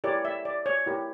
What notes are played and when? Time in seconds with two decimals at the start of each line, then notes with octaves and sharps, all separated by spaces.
0.04 E4 G4 A#4 C#5 D5
0.25 E5
0.45 D5
0.66 C#5
0.86 E4 G4 A#4 C#5